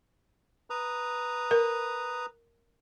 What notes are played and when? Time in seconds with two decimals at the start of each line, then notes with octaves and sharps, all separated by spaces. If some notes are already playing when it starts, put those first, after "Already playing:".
0.70 B4 A#5 D#6
1.51 A#4